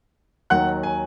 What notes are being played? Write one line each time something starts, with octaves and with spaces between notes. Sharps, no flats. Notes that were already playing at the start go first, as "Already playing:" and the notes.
D#2 D#3 F#3 F#5 F#6
G#5